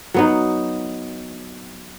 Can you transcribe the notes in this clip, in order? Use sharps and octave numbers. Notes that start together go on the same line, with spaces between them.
F#3 B3 D#4